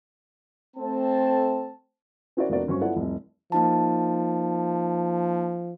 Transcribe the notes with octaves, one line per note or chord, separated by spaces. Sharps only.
A3 C4 A5
C#4 E4 F#4 A#4 C5 D5
F1 B3 D4 F#4 A#4 D5
G1 F#3 C#4 C5 C#6
B3 E4 F4 A4 D5 F#5
F1 C2
F3 A#3 D#4 A5